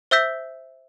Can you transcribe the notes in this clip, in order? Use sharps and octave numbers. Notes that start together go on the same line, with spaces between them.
C5 E5 E6 G6 B6